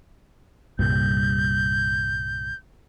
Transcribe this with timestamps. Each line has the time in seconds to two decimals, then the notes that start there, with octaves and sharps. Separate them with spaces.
0.79 C2 G2 A#2 G6